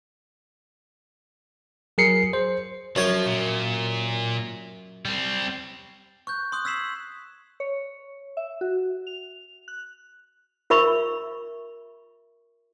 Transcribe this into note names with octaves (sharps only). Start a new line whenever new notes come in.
F#3 G#4 A#4 C7 C#7
C5
F#2 F3 C#5
A#2
G3 C4
C#6 F#6 G6
C6 D#6 F#6
E6 G#6 B6 C7 E7 F#7
C#5
E5
F#4
F7
F#6
F4 A#4 E5 B5 C#6